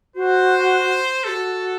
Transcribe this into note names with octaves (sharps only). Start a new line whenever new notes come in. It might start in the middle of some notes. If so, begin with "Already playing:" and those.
F#4 C5
F#4 G#4 A4